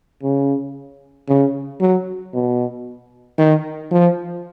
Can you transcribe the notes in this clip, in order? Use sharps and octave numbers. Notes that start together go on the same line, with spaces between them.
C#3
C#3
F#3
B2
D#3
F3